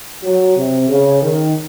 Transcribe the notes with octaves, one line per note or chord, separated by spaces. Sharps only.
F#3
C3
C#3
D#3